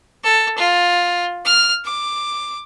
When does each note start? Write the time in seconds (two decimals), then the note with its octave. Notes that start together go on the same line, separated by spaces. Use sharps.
0.24 A4
0.58 F4
1.45 F6
1.85 D6